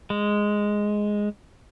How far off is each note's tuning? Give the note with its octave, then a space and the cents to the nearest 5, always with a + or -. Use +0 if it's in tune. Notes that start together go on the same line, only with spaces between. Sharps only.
G#3 +0